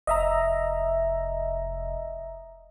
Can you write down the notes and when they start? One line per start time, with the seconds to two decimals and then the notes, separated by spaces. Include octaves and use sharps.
0.07 F1 D#5 E5 A#5